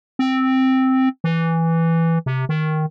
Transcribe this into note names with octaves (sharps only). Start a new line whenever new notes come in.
C4
E3
C3
D#3